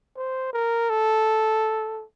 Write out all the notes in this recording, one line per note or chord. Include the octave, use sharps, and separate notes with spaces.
C5
A#4
A4